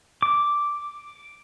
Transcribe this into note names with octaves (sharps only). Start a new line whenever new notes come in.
D6